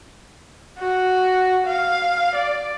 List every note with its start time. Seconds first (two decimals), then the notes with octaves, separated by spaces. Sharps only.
0.79 F#4
1.66 F5
2.35 D5